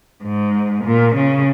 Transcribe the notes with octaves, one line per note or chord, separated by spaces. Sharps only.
G#2
A#2
C#3